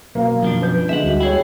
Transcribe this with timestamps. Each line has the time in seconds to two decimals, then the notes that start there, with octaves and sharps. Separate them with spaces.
0.15 B2 F#3 A#3 F5
0.42 F#2 F3 D4
0.62 B4 G6
0.89 D3 G#3 E5 F#5
1.04 D2 G3 F#4
1.20 E4 G#4 C#5 G5